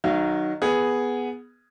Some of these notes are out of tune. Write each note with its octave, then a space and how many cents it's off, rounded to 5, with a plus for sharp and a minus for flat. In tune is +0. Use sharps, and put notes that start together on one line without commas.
D#3 -15 F#3 +0 F5 -45
B3 +0 G#4 +0